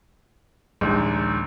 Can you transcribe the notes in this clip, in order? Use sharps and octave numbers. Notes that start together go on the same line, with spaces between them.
A#1 D#2 G#3